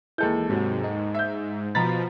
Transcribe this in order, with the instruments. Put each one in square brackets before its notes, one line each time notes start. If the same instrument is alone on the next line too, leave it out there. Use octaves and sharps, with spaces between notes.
[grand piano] D#2 A4 G6 [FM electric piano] E3 G#3
[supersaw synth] G#2 [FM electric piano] C3 F#3
[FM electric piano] D#4
[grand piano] E5 G6
[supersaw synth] B2 F3 [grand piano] A#5 A6 [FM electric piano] B5 B6